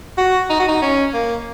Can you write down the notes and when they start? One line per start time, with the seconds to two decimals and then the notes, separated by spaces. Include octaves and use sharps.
0.18 F#4
0.50 D#4
0.60 F#4
0.68 D#4
0.82 C#4
1.14 A#3